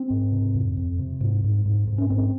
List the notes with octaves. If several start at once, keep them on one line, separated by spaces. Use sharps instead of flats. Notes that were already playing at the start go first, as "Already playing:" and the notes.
Already playing: C4
G#2
C3
F2
F2
C3
G#2
G#2
G#2
G#2
C#4
G#2 C4